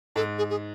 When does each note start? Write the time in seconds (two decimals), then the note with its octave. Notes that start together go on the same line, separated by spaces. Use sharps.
0.16 G#2 A4
0.38 G#4
0.50 G#4